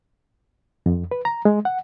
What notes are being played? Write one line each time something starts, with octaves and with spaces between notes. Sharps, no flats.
F2
B4
A#5
G#3
F#5